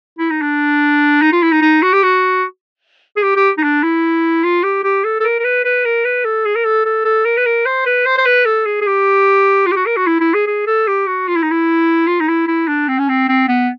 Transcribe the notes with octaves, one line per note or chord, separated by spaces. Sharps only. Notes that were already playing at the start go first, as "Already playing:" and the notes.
E4
D#4
D4
D#4
F4
E4
D#4
D#4
F#4
G4
F#4
G#4
G4
G4
D#4
D4
E4
F4
G4
G4
A4
A4
A#4
A#4
B4
B4
A#4
B4
A4
G#4
A#4
A4
A4
A4
A#4
B4
A#4
C5
B4
C5
C5
B4
A4
G#4
G#4
G4
F4
G4
F#4
A#4
F#4
E4
E4
G#4
G#4
A4
G4
F#4
F4
E4
D#4
E4
F4
D#4
E4
E4
D4
C4
C#4
C4
C4
B3